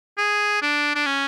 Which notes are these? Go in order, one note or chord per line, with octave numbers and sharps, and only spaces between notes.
G#4
D4
D4
C#4